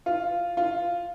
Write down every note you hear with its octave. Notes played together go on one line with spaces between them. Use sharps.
F4
F4